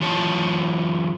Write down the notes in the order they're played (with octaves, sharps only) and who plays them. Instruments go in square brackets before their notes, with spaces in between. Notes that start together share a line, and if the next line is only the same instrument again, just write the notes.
[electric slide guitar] F#2 E3 F4 C#5 A5